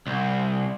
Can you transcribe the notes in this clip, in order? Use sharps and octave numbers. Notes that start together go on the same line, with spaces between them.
C2